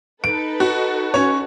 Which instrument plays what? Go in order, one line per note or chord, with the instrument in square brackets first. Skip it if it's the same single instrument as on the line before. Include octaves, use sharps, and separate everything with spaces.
[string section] D#4 A4 B4 [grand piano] D7
[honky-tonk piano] F#4
[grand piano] C#4 C#5